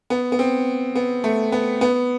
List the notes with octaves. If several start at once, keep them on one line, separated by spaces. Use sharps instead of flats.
B3
B3
C4
B3
A3
B3
B3